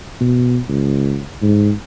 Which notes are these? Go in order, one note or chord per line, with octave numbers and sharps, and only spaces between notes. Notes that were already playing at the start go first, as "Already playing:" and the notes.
B2
C#2
G#2